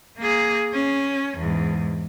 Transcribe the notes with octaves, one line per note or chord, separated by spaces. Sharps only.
A#3 G#4
C#4
E2 G#2